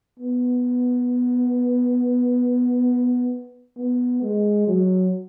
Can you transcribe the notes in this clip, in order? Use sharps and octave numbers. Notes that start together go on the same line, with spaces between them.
B3
B3
G#3
F#3